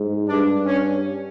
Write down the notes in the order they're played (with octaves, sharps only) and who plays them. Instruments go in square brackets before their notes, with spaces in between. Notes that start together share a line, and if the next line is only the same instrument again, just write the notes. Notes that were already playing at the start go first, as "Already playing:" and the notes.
Already playing: [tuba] G#2
[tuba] G2 [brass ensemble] D4
[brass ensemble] C#4